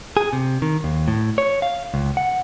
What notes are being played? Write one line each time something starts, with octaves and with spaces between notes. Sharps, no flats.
G#4
C3
D#3
D#2
A2
C#5
F5
C#2
F#5